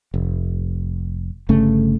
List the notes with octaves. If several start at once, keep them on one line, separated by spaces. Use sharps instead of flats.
F1
G1 C#3 A3